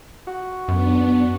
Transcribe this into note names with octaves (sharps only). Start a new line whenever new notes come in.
F#4
F#2 B3 D4